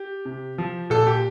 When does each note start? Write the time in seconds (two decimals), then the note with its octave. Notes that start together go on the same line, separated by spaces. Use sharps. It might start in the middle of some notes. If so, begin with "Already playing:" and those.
Already playing: G4
0.25 C3
0.58 F3
0.90 A#2 A4
1.07 G4